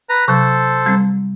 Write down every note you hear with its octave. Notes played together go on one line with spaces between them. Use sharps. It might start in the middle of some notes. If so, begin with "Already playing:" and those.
B4 A#5
C3 F#3 A4 C5
G3 C4